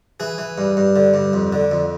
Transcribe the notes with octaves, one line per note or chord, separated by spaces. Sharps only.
E3 G#4
E3
G2
G2
D3
G2
F2
D3
F2